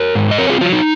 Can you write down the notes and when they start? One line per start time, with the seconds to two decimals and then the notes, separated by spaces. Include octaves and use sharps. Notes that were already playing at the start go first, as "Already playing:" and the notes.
Already playing: A#4 C#5
0.15 G#2
0.31 D#5
0.38 C4 A#4 C#5
0.50 F4 G#4
0.61 F#3 F4
0.73 D#4